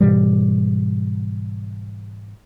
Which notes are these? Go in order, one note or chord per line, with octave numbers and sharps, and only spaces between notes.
G#2 B2 E3 G3